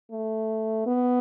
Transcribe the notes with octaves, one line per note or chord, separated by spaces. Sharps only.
A3
B3